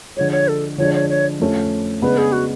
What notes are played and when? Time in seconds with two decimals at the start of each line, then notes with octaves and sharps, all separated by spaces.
0.16 D3 F3 G#3 C#5
0.32 C#5
0.48 A4
0.78 D3 F3 G#3 D4 C#5
0.94 C#5
1.10 C#5
1.40 F2 F3 A3 C#4
2.02 C#3 G#3 B3 D4 B4
2.18 G#4
2.32 F#4